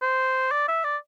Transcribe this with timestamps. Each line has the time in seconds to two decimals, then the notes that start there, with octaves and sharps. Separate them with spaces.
0.02 C5
0.52 D5
0.68 E5
0.84 D5